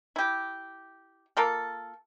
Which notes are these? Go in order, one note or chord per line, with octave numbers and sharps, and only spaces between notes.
E4 G4
A#3 F4 A4